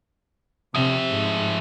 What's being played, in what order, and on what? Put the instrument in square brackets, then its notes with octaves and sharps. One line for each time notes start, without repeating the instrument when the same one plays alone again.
[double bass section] C3 [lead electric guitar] F3 E5
[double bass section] G#2